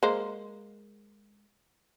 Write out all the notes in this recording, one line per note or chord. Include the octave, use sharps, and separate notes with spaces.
G#3 A#3 C5